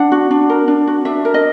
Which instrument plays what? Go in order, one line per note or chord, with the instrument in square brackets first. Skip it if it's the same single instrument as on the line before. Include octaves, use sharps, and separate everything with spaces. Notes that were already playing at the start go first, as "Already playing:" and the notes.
Already playing: [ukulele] D4 F#5
F#4
D4
A#4
D4
F#4
D4 E5
A#4
D#5